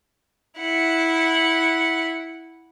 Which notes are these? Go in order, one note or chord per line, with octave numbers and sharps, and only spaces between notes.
E4 F#5